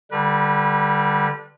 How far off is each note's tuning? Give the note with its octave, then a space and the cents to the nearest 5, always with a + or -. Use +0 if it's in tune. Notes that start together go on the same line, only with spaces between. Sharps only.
D3 +0 G3 +0 B4 -35